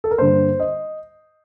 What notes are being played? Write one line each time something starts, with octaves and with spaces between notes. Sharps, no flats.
A4
A#4
G2 D3 G3 A#3 C5
D#5